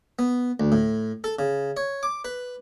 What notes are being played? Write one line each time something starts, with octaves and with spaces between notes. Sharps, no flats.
B3
D2
A2
A4
C#3
C#5
D6
B4